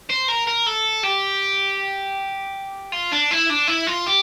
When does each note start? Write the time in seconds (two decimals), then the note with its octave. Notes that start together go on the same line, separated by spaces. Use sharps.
0.10 C5
0.28 A#4
0.48 A#4
0.67 A4
1.04 G4
2.92 F4
3.12 D4
3.31 E4
3.50 D4
3.68 E4
3.87 F4
4.06 G4